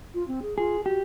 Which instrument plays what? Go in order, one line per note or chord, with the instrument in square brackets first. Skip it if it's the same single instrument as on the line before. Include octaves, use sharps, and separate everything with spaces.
[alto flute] F4
C4
G#4
[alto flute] F4 [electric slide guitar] G#4
[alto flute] F#4 [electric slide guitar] G4